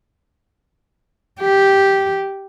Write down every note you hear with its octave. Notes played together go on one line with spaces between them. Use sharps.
G4